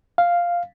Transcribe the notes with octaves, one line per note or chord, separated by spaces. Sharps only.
F5